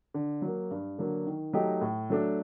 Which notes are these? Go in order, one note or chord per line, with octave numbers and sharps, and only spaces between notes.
D3
F#3 A#3
G2
D3 F#3 A#3
D#3
F#3 A3 D#4 G4
A2
F#3 A3 D4